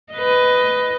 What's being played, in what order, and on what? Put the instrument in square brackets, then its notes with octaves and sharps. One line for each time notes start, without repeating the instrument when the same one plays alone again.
[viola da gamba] B4 D#5